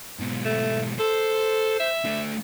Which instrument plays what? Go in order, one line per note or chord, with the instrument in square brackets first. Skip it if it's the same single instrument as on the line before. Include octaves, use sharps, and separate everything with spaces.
[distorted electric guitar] G#2 B2
[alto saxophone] A3
[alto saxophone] A4 [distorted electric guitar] C5
[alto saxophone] E5
[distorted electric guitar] A3 D4